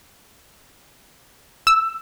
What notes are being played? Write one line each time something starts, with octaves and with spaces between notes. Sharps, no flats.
E6